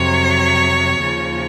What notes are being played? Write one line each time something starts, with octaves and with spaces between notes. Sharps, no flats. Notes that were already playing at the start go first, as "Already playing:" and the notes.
Already playing: F2 C3 F#3 C#5
D#2 C#3 F3